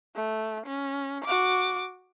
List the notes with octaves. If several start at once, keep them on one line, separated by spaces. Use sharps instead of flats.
A3
C#4
F#4 D6